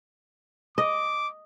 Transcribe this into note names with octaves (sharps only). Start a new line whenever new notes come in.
D#5 D6